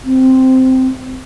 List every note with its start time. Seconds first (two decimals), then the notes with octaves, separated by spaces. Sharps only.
0.04 C4